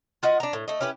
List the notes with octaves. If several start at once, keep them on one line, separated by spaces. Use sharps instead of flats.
F4 F#4 D#5
D4 A#5
A2
A3 D#5
C#4 E4 G4 B4